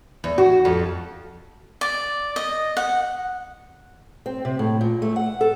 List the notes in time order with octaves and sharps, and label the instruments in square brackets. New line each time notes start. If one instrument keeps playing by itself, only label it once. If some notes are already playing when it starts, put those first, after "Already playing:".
[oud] E2
F#4
F2
[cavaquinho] D5
D#5
F#5
[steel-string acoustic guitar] C4
C3
A2
A#2
A3
F#5
A4